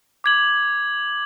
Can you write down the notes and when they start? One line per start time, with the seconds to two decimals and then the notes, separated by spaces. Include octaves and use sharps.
0.24 D6 G#6 F#7